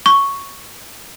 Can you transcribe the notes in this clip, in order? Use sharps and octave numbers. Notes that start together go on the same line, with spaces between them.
C#6